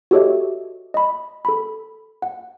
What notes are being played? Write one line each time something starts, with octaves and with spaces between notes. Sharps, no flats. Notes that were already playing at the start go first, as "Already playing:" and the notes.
F#4 G4 A4 C#5 D#5 E5
F#4
D#5 B5
A4 B5
F#5